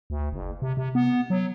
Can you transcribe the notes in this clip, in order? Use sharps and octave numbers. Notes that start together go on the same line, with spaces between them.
D2
F#1
C3
C3
B3
F#3